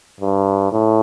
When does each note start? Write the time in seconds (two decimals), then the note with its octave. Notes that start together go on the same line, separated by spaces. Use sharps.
0.21 G2
0.72 A2